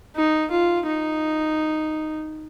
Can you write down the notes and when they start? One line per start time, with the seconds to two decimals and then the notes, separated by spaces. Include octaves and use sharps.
0.16 D#4
0.51 F4
0.87 D#4